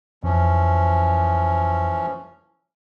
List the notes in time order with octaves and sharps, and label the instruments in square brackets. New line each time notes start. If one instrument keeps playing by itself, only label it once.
[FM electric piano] F2 [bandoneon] E3 F3 C#4